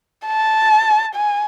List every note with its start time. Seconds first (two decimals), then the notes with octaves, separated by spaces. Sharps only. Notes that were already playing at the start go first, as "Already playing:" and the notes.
0.26 A5
1.15 G#5